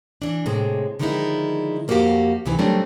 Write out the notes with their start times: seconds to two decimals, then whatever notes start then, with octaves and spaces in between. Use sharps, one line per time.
0.22 E3 D4
0.46 A2 C3 G#3
0.99 D3 D#3 F3 G#3 D#4 E4
1.88 F2 A#3 D#4 F#4 G4 F5
2.46 D2 C3 D#3 E3 G#5
2.58 F#3 G3 A3 A#3 C4 D4